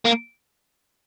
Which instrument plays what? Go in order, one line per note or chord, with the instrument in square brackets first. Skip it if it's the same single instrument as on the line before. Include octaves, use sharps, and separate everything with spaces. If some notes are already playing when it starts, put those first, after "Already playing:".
[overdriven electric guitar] A#3